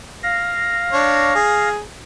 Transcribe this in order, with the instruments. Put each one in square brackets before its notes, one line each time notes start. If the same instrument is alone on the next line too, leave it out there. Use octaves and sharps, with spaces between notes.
[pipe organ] F5 A#6
[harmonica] D4 C#5
G#4